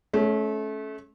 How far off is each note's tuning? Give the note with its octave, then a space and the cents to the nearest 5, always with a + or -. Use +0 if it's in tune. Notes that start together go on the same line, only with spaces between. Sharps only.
A3 -30 C#4 +0